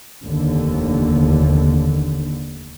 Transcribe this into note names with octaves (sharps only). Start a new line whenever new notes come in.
F1 D#2 D3